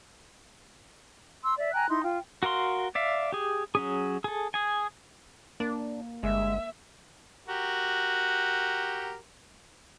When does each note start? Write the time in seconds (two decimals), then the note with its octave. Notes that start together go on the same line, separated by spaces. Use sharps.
1.43 C6 E6
1.57 D5 E5
1.72 G5 G#5 A#5 F#6
1.89 D#4 E4 C6
2.04 F4 G5
2.43 F#4 A#4 F5 C6
2.95 D5 E5 F5
3.32 G4 G#4
3.75 F#3 C#4 G#4
4.24 G#4 A4
4.54 G#4 G#5
5.60 A#3 D4
6.23 G1 G#3 E5
7.47 F#4 G4 A#4